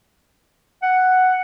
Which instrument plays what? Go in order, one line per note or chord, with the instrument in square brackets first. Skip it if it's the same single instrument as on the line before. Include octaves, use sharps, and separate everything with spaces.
[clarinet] F#5